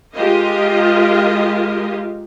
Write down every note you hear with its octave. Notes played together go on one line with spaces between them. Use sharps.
G#3 F4 G4 A#4 D#5 F5